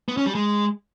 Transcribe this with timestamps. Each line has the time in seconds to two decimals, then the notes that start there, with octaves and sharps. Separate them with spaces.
0.08 B3
0.17 C#4
0.26 G3
0.35 G#3